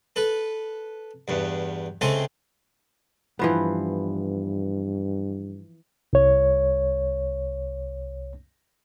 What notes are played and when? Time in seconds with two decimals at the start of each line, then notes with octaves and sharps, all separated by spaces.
0.16 A4 B4
1.28 E2 G2
2.01 C#2 A3 C4 A4 G#5 C6
3.39 G2 E3 F3 B3
6.13 C2 C#5